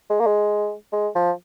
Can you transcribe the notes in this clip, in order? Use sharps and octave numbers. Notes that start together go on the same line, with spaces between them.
G#3
A#3
G#3
G#3
F3